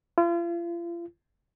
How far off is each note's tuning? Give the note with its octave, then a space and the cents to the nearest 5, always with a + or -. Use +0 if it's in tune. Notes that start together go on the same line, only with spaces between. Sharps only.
F4 -40